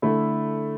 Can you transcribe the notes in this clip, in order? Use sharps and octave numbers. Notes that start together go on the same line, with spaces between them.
D3 A3 E4